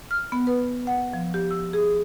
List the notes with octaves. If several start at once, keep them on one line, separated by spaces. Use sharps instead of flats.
F6
B3
B4
F#5
F3
G4
E6
G#4